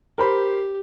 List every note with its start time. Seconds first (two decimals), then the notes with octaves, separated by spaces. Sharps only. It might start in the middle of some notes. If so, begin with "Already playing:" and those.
0.18 G4 A#4 C5 B5